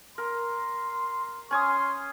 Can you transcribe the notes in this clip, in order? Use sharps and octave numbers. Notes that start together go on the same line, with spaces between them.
A#4 C6
C#4 G#5 C6 D#6